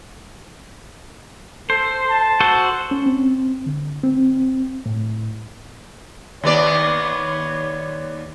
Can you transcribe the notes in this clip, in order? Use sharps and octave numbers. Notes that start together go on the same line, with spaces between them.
A4 C5
A5
F#4 A4 C5
C#4
C4
D3
C4
A2
D#2 B3 C#5 D5